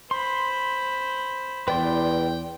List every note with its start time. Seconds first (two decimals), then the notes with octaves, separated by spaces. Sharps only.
0.11 C5 B5 C6
1.68 E2 B4 D5 G5 C6